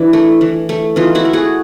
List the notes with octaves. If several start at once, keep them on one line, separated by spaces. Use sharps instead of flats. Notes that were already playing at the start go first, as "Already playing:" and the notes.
Already playing: E3 D4 E4
A3
E3
A3
E3 D#4 F4
E4 F#4
A3
F#4 G#4